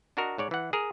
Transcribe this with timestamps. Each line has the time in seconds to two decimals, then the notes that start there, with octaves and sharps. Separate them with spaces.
0.17 D4 F#4 A#4 D#5
0.38 G#2 C#5 D5
0.51 E3 F#5
0.73 G#4 A#4